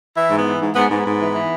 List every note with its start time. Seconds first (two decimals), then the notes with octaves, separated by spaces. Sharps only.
0.16 E3 E4
0.30 G#2
0.39 B3
0.46 E3
0.60 G#2
0.75 G#2 B3
0.90 G#2 B3
1.06 G#2
1.20 E3
1.34 E3